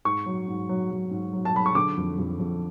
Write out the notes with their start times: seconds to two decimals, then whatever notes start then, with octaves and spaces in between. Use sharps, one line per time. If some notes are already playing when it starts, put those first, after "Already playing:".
0.05 G#2 C#6
0.26 F#3
0.48 G#2
0.69 F#3
0.91 F#3
1.11 G#2
1.33 F#3
1.45 A5
1.54 F#3 B5
1.66 C#6
1.75 D3 D6
1.97 F2
2.18 F2
2.39 F2